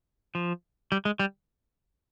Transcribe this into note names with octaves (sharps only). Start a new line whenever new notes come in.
F3
G3
G#3
G3